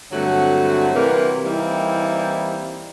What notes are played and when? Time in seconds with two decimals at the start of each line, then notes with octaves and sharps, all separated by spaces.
0.12 G2 D3 F#3 A3 C4 F#4
0.95 C3 E3 G3 A#3 A#4 B4
1.44 E3 G3 A#3 C4 D#4 E4